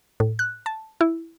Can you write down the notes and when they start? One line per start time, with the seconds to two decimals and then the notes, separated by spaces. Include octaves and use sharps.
0.20 A2
0.39 F#6
0.66 A5
1.01 E4